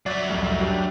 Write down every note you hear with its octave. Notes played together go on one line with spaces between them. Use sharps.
F#3 D5 E5
C2 F2 A2
D4 G4